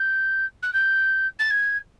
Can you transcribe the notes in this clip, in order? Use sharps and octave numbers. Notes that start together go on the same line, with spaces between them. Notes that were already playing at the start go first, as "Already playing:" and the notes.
Already playing: G6
F#6
G6
A6
G#6